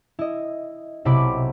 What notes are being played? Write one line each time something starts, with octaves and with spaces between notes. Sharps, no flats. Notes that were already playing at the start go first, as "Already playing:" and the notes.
E4 D#5
B1 C3 E4 B5 D6 D7